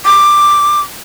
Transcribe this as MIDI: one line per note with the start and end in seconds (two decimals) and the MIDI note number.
0.05 0.81 86